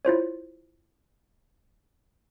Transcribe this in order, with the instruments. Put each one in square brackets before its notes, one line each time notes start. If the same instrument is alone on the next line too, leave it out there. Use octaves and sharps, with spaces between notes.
[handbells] E4 F4 C5 C#5